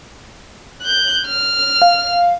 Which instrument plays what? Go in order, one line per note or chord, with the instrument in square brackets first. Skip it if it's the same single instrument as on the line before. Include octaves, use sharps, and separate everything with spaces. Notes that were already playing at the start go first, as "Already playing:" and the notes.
[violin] F#6 G6
F6
[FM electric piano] F5